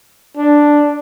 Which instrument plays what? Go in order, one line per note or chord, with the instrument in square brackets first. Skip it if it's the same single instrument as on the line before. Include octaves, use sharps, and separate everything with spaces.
[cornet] D4